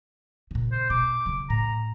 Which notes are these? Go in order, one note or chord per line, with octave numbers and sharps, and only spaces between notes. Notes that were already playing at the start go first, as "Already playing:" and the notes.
A#2 C#3
C5
B2 D6
C#3 F#3
A2 A#5